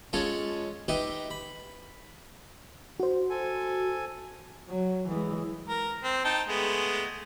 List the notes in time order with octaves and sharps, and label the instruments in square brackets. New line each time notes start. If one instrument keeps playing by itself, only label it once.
[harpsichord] G#3 C#4 F4 A4 C#5
D#4 G4 B4 D#5 E5
B5
[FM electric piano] F#4 C5
[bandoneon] A4 G#5
[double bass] F#3
E3 G#3
[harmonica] A#4
C4
D#4 G5 A5
G#3 A3 B3